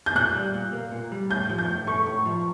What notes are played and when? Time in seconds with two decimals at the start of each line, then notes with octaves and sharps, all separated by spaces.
0.06 G6
0.15 A#2 F#6
0.35 G3
0.55 A#2
0.73 A#3
0.92 A#2
1.12 G3
1.30 A2 G6
1.50 F3
1.58 G6
1.69 A2
1.87 A3 C#6
2.06 A2
2.26 F3